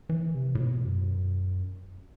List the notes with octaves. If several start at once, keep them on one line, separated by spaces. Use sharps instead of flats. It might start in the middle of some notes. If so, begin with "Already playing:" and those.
E3
C3
A2
B2
F#2